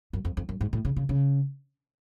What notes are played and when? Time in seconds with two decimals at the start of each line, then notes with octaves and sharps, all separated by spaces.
0.13 F#2
0.25 F2
0.37 F2
0.49 F#2
0.61 G#2
0.73 A2
0.85 C#3
0.96 C#3
1.09 C#3